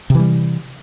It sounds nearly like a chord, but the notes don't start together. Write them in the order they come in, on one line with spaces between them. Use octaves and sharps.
C3 E3 G3